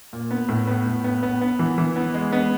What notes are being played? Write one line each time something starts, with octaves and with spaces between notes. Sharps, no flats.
A#2
B3
A2
B3
A2
B3
B3
B3
E3
E3
B3
G#3
B3